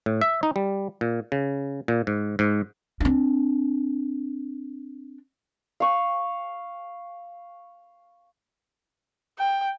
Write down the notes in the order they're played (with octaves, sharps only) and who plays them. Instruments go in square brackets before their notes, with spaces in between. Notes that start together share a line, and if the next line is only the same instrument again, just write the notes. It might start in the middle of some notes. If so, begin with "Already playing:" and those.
[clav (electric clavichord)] A2
E5
D#4
G3
A#2
C#3
A#2
G#2
G#2
[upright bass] C4 D4
[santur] F5 C#6
[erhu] G5